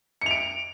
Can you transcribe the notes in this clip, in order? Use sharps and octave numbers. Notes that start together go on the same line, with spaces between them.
C#7 D7 F7